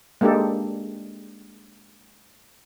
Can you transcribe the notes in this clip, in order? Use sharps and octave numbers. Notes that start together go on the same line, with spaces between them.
G#3 A#3 D4 G4 A4